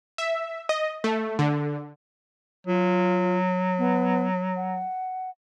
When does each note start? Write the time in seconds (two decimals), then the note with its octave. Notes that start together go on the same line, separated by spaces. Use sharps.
0.18 E5
0.69 D#5
1.04 A3
1.39 D3
2.67 F#3 F4
3.78 B3
4.56 F#5